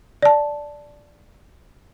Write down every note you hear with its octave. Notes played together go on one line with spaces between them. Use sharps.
D5 A5